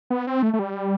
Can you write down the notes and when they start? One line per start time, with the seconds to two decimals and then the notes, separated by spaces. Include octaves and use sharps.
0.10 B3
0.27 C4
0.42 A3
0.53 A3
0.59 G3